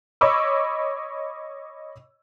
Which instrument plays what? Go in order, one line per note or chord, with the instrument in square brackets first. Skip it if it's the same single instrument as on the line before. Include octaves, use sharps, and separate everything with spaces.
[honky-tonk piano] C#5 D#5 B5 C#6 D6 E6